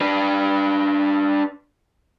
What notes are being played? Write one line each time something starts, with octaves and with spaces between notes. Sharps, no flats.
D4 B4